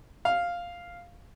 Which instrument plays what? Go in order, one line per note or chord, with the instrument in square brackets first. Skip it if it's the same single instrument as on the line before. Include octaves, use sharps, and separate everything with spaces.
[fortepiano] F5